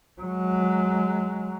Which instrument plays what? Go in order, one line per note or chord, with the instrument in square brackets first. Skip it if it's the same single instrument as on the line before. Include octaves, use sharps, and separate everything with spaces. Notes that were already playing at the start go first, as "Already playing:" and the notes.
[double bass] F#3 G#3